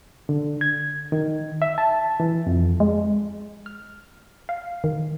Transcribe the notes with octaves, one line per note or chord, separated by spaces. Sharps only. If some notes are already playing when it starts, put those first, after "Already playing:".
D3
G#6
D#3
E5
A5
E3
F2
G#3
F6
F5
D#3